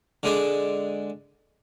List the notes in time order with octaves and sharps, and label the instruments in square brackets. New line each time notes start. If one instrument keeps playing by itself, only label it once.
[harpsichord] D3 G#3 D4